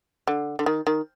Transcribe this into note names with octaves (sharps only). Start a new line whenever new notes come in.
D3
D3
D#3
D#3